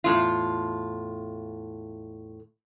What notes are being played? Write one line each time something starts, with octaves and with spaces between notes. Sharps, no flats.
E2 A2 F4